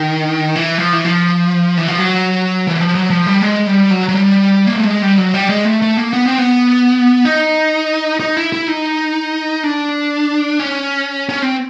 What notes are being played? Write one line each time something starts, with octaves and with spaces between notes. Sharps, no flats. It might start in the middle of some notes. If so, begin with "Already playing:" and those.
Already playing: D#3
E3
F3
E3
F3
E3
F3
F#3
E3
F3
F#3
F3
G3
G#3
G3
F#3
F#3
G3
A#3
A3
G#3
G3
F#3
G3
G#3
A3
A3
A#3
B3
C4
B3
D#4
D#4
E4
E4
D#4
D4
C#4
C#4
C4